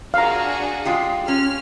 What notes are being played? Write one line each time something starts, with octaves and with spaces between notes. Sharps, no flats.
D4 F#4 G#4 F5 A#5
G#3 F4 G4
C#4 F6